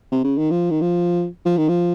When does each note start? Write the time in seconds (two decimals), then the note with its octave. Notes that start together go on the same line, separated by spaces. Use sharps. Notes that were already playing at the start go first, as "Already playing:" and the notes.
0.12 C3
0.24 C#3
0.38 D#3
0.51 F3
0.70 D#3
0.82 F3
1.46 F3
1.57 D#3
1.69 F3